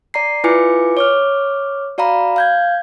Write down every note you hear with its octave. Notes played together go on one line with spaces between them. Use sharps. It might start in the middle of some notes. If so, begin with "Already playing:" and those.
D5 A#5 C7
E4 F4 B4 G#5 D6 C#7
C#5 D6 F6
F#4 D5 F5 A#5 B5
F5 G6 G#6